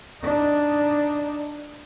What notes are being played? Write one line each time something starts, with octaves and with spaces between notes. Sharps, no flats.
D4 D#4